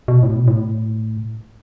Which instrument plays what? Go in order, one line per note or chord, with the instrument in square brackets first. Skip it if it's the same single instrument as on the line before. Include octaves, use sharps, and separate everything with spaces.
[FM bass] B2
A2
B2
A2